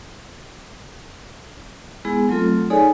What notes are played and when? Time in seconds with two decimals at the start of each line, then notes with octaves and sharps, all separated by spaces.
2.05 G#3 B3 E4 G#4
2.29 F#3 A3 C4 F4 A4
2.70 D#4 G#4 A4 C#5 D5 G#5